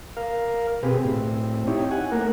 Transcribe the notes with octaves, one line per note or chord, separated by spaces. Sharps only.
A#4 F5
B2 C4 G4 G#4 B4
A2 C4
D#4 E4 G4 C#5
F#5 G#5
A3 A#3 A#4 F#5